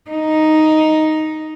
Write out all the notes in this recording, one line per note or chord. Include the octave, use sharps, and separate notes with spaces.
D#4